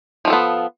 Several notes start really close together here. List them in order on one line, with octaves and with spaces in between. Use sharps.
F3 F4 A4 B3